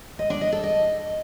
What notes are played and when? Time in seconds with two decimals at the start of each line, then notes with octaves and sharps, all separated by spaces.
0.19 D#5
0.30 D4
0.41 D#5
0.52 A4
0.64 D#5